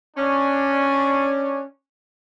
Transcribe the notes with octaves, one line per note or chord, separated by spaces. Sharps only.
C#4 D4